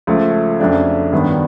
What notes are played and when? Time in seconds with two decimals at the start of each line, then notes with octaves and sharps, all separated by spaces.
0.07 C#2 C#3 F3 A3
0.60 F2 C#3 F#3 A3 D4
1.12 G2 D#3 F#3 B3 D4